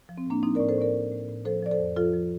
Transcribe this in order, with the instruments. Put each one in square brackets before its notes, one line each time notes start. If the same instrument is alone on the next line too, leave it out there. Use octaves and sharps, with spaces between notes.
[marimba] F3
C4
A2 A#3 D4
F3 C4 D#4
A2 A#4 D5
A4 C5
A2 A#4 D5
A2
A2
A2
F3 A4 C5
F3 D5
A4 C5
F2
F3 F4 A4
F3